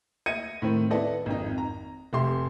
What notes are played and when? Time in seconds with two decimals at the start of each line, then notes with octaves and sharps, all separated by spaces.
0.26 D#5 E5 G#6 C#7 D#7
0.62 A2 D#3 C4
0.91 B3 E4 A4 D5 D#5
1.26 G#1 F2 D#4
1.58 A#5
2.13 F1 G4 E5 C6